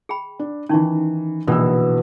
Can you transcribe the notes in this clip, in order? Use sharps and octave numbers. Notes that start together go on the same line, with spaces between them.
G#4 G5 B5
D4
D#3 E3 C#4 D#4 C#6
A#1 B2 E3 E6